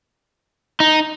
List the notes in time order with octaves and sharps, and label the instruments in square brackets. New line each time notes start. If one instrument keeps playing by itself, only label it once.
[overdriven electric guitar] D#4